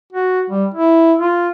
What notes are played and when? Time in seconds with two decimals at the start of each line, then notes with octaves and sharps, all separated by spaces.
0.13 F#4
0.50 G3
0.74 E4
1.19 F4